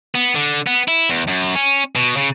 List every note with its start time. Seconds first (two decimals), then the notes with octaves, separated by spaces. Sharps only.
0.15 B3
0.35 D3
0.67 B3
0.88 E4
1.09 E2
1.28 F#2
1.55 C#4
1.96 B2
2.17 C#3